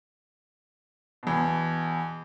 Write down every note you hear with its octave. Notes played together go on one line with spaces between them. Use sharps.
E2 B2